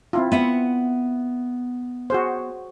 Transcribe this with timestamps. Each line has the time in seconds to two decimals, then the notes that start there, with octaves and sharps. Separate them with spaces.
0.13 C4 E4 F4
0.32 B3 E5 F#5
2.10 F#4 G#4 C5